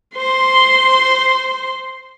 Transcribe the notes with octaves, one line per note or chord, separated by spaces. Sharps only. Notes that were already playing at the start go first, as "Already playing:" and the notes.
C5 C6